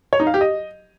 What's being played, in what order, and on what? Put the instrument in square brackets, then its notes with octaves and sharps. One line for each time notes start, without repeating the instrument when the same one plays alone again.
[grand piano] C#5
D#4
F5
G4
D#5